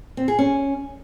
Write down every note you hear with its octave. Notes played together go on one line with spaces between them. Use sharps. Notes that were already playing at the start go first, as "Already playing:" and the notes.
C4
G#4
C#4